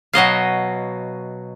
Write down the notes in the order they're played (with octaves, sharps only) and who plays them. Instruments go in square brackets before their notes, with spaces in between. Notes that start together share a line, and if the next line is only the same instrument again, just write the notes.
[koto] B2 F#3 D#5 F5